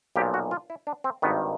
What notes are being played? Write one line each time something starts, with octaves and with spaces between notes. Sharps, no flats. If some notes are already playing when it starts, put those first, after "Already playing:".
B1 A#2 F3 G4
F#4
F4
E4
D4
C4
G#1 G2 D#3 B3